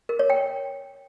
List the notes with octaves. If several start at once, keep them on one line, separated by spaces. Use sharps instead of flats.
A#4
C#5
G5